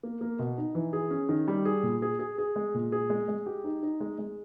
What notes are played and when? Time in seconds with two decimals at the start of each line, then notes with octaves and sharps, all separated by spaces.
0.03 A#3
0.21 A#3
0.39 B2
0.58 D#4
0.75 E3
0.93 G#4
1.11 C#4
1.29 D#3
1.48 G3
1.65 G#4
1.83 A#2
2.02 G#4
2.19 G#4
2.38 G#4
2.56 G#3
2.74 A#2
2.92 G#4
3.10 G#3
3.28 G#3
3.46 G4
3.64 D#4
3.83 D#4
4.00 G#3
4.19 G#3